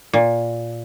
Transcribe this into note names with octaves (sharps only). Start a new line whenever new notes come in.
A#2